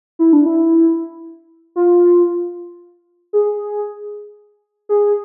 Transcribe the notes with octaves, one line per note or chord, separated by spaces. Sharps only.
E4
D4
E4
F4
G#4
G#4